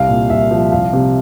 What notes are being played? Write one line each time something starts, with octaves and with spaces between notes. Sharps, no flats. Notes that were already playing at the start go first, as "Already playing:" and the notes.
Already playing: C2 F5
A#2
C2 E5
F3
C2 F5
C3